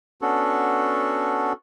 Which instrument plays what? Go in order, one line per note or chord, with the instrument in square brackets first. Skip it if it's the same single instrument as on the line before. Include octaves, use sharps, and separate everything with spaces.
[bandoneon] B3 C#4 D4 F#4 A4